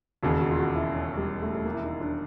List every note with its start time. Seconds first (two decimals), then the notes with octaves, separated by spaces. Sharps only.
0.23 E1 D#2 C#3 F#4
0.41 F#4
0.51 F4
0.59 F#4
0.76 E4
0.94 C#4
1.17 G3
1.42 A3
1.55 A3
1.65 A#3
1.74 E4
1.84 D#4
2.01 D4